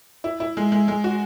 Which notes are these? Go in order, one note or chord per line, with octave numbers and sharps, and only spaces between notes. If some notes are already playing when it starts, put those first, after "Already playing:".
E4
E4
G#3
G#3
G#3
F#4